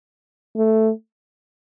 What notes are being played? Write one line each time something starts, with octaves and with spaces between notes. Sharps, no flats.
A3